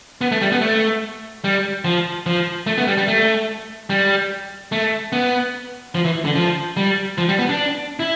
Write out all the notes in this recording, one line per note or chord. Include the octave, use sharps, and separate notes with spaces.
B3
A3
G3
B3
A3
G3
F3
F3
A3
B3
G3
G3
A3
G3
A3
B3
F3
E3
D3
F3
G3
F3
G3
B3
D4
E4